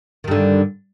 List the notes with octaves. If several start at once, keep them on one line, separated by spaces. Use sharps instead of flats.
G2 D3 D#3